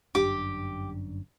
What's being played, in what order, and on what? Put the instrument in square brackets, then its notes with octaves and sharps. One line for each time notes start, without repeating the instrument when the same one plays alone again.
[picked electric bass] G1 F#2 D4 [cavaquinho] G4 D6